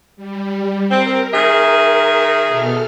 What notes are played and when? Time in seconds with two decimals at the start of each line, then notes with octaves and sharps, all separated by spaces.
0.16 G3
0.91 C4 A#4
1.33 D#3 G#4 E5
2.47 B2 A4 F6